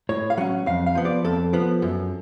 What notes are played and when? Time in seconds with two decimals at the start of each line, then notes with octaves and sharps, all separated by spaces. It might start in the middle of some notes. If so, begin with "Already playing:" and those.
0.09 A2 C#5
0.30 F5
0.38 F#3 C#4 F#5
0.66 F2 F5
0.86 F5
0.95 F3 B3
1.05 D5
1.24 F2 A4
1.53 F3 B3
1.82 F#2